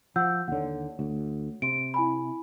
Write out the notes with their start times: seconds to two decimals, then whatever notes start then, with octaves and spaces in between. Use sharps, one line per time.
0.16 F3 F#5 E6 G6
0.48 D#2 D3 C#5 F#5
0.99 D2
1.62 C3 C6 D7
1.94 E4 G#5 B5